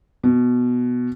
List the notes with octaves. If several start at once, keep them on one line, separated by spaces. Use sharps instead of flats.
B2